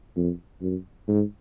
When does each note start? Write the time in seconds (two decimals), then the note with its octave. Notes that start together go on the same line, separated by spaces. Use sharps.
0.16 F2
0.61 F#2
1.08 G#2